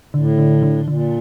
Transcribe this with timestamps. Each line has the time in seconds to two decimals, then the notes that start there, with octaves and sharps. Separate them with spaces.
0.14 A2 D3
0.38 D3
0.63 D3
0.87 A#2 D3